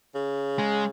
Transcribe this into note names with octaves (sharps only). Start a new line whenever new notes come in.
C#3
G#3